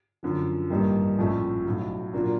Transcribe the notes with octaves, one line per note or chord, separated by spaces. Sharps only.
F#2 D3 F3
A1 G2 D#3 G3 A#3
A#1 A2 F3 A3 C#4
B1 A2 F#3
A#2 F#3 A#3 D4 F4